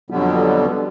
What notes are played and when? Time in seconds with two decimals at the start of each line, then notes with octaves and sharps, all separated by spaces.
0.10 F2 B2 D3 F#3 G3 B3